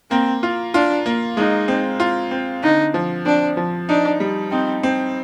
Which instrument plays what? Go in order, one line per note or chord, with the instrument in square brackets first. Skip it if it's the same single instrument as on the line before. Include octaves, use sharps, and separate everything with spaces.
[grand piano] A#3 [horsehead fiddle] C4
[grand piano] F4
[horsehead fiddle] D4 [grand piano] F4
[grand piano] A#3
[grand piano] G#3 [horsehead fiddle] D#4
[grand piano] C4
F4
C4
[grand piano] D3 [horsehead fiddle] D#4
[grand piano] F3
[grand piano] C4 [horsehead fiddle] D4
[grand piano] F3
[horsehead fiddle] D4 [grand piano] D#4
[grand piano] G3
[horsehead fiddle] C4 [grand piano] D#4
[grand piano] C4